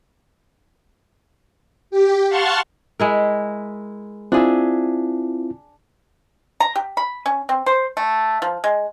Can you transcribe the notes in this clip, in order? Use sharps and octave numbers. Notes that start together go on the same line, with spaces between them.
G4
F5 F#5 A5 C6 C#6
G#3 E4 A#4
C4 D4 E4 F4 G#4 E5
A#5
G4
B5
C#4
C4
C5
A3
F3
G#3